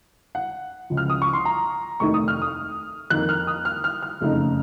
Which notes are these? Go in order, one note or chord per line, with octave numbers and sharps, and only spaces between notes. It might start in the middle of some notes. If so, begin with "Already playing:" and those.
F#5
C#2 C#3 F3
F6
D#6
C#6
C6
A#5
F1 D#2 D#3 A3 D#4 C#6
D#6
F6
D#6
F2 D#3 A#3 F#6
F6
D#6
F6
F6
F6
F#1 F2 C#3 A3 D#4